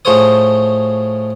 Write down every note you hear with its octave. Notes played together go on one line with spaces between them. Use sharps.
A2 F3 G#4 C5 C#5 D#6